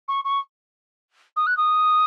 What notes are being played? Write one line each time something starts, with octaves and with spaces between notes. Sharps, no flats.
C#6
C#6
D#6
F#6
D#6